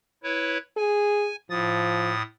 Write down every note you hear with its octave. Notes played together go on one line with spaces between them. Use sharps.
E4 B4 C#5
G#4 G#5
A2 F3 D#6 A6